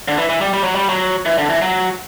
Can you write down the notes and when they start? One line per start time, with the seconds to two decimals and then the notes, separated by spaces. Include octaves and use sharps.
0.08 D3
0.17 E3
0.29 E3
0.41 G3
0.53 G3
0.64 F#3
0.75 G3
0.89 F#3
1.26 E3
1.38 D3
1.50 E3
1.62 F#3